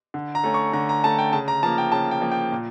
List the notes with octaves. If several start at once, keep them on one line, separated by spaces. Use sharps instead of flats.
D3
A#5
A3 C#4
C#6
D3 A#5
A#5
A3 C#4 A5
G5
C#3 A5
A#5
F3 A#3 A5
G5
C#3 A5
G5
F3 A#3
G5
A#2